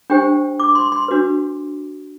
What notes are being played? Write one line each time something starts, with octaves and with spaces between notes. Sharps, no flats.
D4 G4 C5 G5
D6
C6
C6
D4 F#4 B4